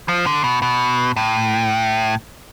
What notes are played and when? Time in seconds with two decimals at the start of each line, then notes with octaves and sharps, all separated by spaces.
0.08 F3
0.26 D3
0.44 B2
0.62 B2
1.16 A2